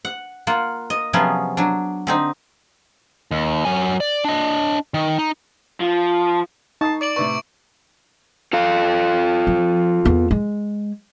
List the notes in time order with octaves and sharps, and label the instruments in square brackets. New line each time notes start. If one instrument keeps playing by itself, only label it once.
[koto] F#5
A#3 F4 F#5
D#5
C3 F3 F#3 B3 C#4 G#4
F#3 D4
D3 C4 D#4
[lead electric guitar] D#2
F#3 G#5
D5
D4 D#5
D#3
D#4
[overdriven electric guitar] F3
[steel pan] D#4 [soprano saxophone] A5 [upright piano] C#6 D#6 C7
[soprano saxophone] D5 [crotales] D6 D7 F#7
[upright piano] A2 C3 B4 [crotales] C#6
[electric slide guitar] F4 A4 F5
[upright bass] F3
E2 B3
G#3